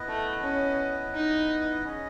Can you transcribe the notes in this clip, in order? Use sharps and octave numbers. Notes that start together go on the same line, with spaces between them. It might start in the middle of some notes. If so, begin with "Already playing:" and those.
Already playing: B3 E4 B4 D#5
A3
C#4
D#4
C#4 G#4 D#5